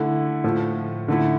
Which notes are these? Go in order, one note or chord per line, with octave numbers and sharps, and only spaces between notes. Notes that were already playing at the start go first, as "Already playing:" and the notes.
Already playing: D3 A3 E4
A2 F3 A3
D3 A3 E4